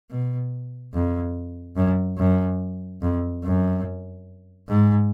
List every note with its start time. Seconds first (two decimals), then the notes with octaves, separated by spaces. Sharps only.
0.10 B2
0.94 F2
1.77 F#2
2.18 F#2
3.02 F2
3.44 F#2
4.68 G#2